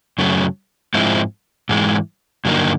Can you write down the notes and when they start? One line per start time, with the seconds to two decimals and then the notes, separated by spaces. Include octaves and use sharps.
0.18 F#2 C#3 F#3 A3
0.94 G#2 F3 G#3 C4 E4
1.69 G#2 E3 G#3
2.45 G2 D3 F#3 A#3 D#4